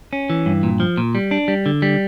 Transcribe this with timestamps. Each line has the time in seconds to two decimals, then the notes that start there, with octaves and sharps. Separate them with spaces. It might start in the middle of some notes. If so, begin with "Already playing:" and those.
0.13 C#4
0.30 E3
0.46 G2
0.63 A#2
0.80 F3
0.97 A#2
1.15 G3
1.31 D4
1.48 G3
1.66 D3
1.82 G3